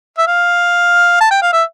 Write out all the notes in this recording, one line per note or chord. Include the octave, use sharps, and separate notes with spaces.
E5
F5
A5
G5
F5
E5